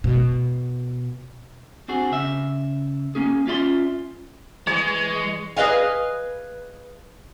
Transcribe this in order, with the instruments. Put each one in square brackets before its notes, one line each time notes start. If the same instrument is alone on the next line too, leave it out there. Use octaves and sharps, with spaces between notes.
[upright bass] B2
[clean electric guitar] C4 D4 F#4 G#4
C#3 E5
A#3 C#4 G#4
C#4 F4 D5 E5 B5 C6
[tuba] E3 [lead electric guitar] G#3 [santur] C#5
[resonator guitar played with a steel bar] G#4 B4 D#5 F5 G#5